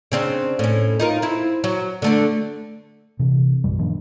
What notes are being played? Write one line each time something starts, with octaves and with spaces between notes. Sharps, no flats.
C#3 C4 D4
A2 C#4
D#4 F4 A#4
C4 E4
F#3
D3 A3 D4
C3 E3
A#1 F#2 G3
D#3 F3 A#3 D4